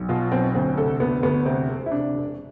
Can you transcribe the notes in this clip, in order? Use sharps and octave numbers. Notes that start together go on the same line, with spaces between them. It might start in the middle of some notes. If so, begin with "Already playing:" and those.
Already playing: B1
B2 F4
B1 C4
D2 C4
C3 A4
D2 B3
D2 B3
C3 C4
E1
E4
C3 D4
E1